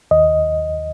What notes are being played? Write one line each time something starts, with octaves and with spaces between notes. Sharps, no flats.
D#2 D#5